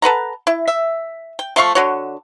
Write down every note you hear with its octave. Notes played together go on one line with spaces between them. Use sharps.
A4 B4 F#5 A#5
E4
E5
G5
F3 A3 F5 C#6
D3 F#4 C#5